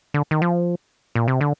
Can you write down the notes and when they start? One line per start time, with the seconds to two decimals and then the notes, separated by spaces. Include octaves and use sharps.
0.14 D3
0.31 D#3
0.42 F3
1.15 A#2
1.28 C3
1.41 D3